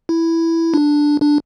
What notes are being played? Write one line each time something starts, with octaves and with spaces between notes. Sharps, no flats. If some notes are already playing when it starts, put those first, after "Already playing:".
E4
D4
D4